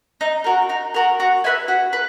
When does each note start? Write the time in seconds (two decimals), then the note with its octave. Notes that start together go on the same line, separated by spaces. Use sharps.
0.21 D#4
0.44 F#4 A#4
0.69 D#4
0.94 F#4 A#4
1.20 F#4
1.44 B4 E5 G#5
1.68 F#4
1.93 B4